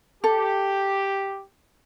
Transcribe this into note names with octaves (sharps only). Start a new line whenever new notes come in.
G4 A4